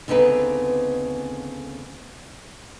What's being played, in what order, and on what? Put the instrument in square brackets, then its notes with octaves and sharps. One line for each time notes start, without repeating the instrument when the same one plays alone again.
[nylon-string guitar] D2 C#3 B3 C4 D#4 B4